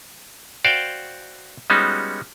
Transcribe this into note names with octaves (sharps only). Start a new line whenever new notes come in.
F#4 C5 D5 F5 G5
G3 G#3 B3 C#4 D#4 F#4